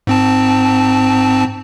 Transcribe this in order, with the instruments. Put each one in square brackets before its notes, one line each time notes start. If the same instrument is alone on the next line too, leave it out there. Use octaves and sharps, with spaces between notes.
[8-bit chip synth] G#2 C4 A5